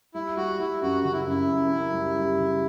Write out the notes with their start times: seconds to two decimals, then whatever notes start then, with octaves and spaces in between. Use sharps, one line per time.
0.14 G3 E4
0.37 G3 F#4
0.59 G3 E4
0.81 F#2 F#4
1.04 C#3 F#4
1.12 E4
1.26 F#2 E4
1.49 F#2
1.71 F#2
1.93 G3
2.16 G3
2.38 C#3